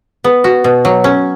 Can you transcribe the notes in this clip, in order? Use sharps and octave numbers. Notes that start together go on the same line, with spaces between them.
B3
F#4
B2
F#3
C#4